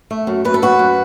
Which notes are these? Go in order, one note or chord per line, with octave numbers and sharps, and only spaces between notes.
A3
F#2
F#2 B4
A4
F#2 F#4 B4
F#2